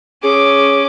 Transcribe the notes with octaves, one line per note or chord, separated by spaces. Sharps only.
C#4 G#4 D6